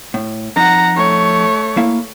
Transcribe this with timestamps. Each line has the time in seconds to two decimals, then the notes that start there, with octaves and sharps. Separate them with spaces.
0.14 A2
0.56 F2 D#4 F#5 A#5
0.96 A3 C#5
1.77 A#3 E4 F5